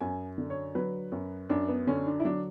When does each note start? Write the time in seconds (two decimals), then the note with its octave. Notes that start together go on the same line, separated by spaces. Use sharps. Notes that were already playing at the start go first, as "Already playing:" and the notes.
0.01 F#2 G#5
0.38 D3
0.50 C#5
0.75 F#3 B4
1.12 F#2
1.50 F#2 D4
1.68 B3
1.87 D3 C#4
2.06 D4
2.20 E4
2.25 F#3 D4